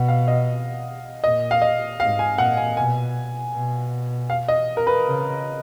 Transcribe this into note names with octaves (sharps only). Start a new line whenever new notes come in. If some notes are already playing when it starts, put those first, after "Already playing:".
Already playing: B2 F#5
F5
D#5
A#2 D#5
F5
D#5
G#2 F5
G#5
A#2 F#5
G#5
B2 G#5
B2
F5
D#5
A#4
B4
C#3